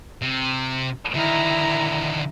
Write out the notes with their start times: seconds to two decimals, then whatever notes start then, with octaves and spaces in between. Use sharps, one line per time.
0.22 C3
1.15 D3 D#3 E4 A#5